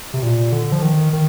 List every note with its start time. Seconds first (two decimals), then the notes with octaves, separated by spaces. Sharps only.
0.14 C3
0.23 A#2
0.52 D3
0.72 F3
0.82 D#3
1.13 D#3